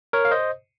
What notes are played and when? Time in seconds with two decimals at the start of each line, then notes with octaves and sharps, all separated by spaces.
0.13 A#4 C#5
0.25 F5
0.31 C5 D#5